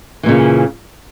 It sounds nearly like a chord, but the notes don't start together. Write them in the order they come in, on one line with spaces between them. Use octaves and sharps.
E3 A#2 C#3